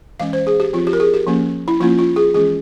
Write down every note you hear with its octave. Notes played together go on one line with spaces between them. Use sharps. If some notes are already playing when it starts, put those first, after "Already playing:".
E3 G#3 C#4 F5
C5
G#4
G4
F3 C4 F4
G4
A#4
G#4
G4
F3 A#3 C#4
E4
F3 A#3 C#4 F4
F4
G#4
E3 G#3 C#4 G#4